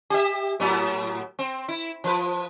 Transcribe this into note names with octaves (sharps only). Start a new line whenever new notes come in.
G4 E5
A2 F#3 B3
C4
E4
F3 B4